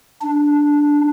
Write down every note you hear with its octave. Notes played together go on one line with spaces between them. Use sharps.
D4